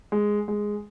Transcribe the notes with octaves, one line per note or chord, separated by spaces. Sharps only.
G#3
G#3